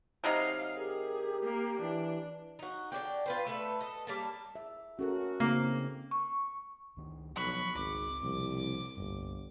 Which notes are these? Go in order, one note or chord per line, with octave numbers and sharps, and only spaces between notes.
C3 F#3 D#4 F5
G4 G#4 A#4
A#3
E3 D4
D#4 F#4
D3 F#4 D5 G5
F4 B4 C5
A3 A4 B4
A4 D#5
G3 A#3 A5
E5
C#4 F#4 A4 A#4
C#3 A#3 C4 D#4
C#6
C#2 D#3
B1 F3 F#3 B5 C#6 F#6
G#1 C#2 D6
C2 B2 F3
G1 C2 G2